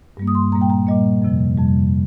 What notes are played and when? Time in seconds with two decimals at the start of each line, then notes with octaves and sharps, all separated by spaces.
0.17 G2 G3 A#3
0.27 D#6
0.35 C6
0.52 A#2 G3 A#3 A#5
0.61 G5
0.70 A#5
0.87 A#2 G3 A#3 D#5
1.22 F2 C3 F3
1.58 F2 C3 G3